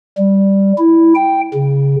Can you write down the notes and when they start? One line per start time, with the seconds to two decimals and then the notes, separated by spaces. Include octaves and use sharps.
0.18 G3
0.78 E4
1.15 G5
1.54 C#3